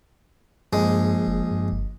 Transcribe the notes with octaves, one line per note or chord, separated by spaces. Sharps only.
A#1 G2 G#3
F#1
G2
G1